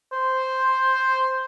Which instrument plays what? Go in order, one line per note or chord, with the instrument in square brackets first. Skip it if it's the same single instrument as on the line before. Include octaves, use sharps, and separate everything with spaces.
[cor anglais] C5